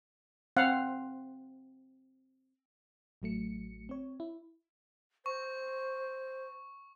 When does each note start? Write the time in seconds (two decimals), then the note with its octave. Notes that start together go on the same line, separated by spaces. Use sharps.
0.56 C4 F5 F#5
3.22 A1 F#3 A3 C#7
3.89 C4 C#5
4.20 E4
5.26 C5 C#6